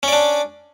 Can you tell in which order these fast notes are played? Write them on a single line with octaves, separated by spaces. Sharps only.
C#4 D5 D4